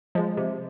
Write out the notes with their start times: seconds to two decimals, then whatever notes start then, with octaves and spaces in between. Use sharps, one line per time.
0.15 F3 G#3 D#5
0.37 C3 C5